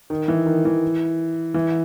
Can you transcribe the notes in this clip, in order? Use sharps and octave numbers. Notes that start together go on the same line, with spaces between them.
D#3
E3
D#3
E3
E3